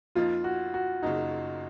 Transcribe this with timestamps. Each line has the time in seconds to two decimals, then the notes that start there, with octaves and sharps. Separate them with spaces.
0.15 F2 F3 A#3 D#4 F4
0.44 F#4
0.74 F#4
1.02 F#1 F#2 C#3 D#4